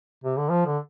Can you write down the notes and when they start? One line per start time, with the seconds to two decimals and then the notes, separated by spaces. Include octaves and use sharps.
0.24 C3
0.37 D3
0.49 F3
0.66 D3